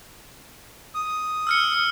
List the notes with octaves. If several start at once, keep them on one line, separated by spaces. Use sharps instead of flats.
D#6
E6 F6 C#7